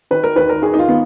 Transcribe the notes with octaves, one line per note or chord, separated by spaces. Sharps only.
D#3 B4
A#4
D#2 B4
A#4
D#2 G#4
D#4
F4
D#3 B3